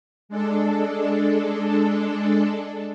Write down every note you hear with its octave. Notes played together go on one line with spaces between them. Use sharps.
G#3 D4 A4